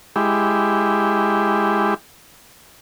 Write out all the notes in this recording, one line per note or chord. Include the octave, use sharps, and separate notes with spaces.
G#3 E4 G4